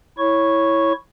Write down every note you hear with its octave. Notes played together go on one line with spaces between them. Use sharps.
E4 C#5 C#6